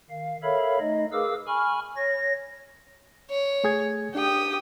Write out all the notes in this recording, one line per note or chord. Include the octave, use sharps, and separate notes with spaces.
D#3 F5
A4 A#4 C#5 E5 F5 B5
A3 D#4 D#5
G#4 A#4 B4 F5 D6 E6
G#5 B5 C#6 F6
C#5 A#6
C#5
A3 G#4 G#6
D4 G4 G5 D#6